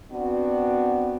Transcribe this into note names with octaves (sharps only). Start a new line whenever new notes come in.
B3 C4 D4 F#4